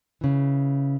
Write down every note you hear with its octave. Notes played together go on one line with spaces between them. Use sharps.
C#3 E3